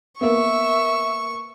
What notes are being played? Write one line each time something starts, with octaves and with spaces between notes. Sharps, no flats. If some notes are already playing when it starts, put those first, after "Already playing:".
A#3 B3 E5 C#6